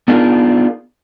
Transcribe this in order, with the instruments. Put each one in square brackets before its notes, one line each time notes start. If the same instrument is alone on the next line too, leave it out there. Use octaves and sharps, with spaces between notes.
[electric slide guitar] B3 D4 D#4 F4 G#4 A#4